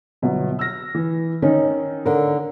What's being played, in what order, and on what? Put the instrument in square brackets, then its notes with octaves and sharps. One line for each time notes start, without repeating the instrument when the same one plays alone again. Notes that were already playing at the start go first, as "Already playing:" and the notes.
[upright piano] G1 B2 F#3
E6 F6 A#6
E3
[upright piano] D#3 D#4 [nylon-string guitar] C#4
[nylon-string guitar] D3 A#4